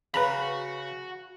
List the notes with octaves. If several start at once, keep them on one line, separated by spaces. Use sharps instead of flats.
C#3 F#4 B4 A#5 B5